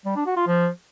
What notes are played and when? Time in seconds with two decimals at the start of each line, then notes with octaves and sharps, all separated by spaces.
0.06 G3
0.16 D4
0.26 F#4
0.36 F4
0.47 F3